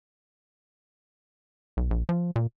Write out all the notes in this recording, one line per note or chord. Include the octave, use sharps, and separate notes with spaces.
B1
A#1
F3
A#2